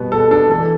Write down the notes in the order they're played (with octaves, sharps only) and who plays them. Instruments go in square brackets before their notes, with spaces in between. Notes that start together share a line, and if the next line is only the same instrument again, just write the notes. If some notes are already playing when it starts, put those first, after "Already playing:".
Already playing: [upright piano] B2 G3 B3
[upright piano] B2 [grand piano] A4
[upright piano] D4 [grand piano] A4
[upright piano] E3 [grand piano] A4